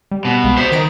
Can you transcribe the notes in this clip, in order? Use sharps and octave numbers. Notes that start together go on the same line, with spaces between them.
G3
B2
C2 G#3 F5
C5 D5 E5 F#5
D#3 G#6 A#6 D7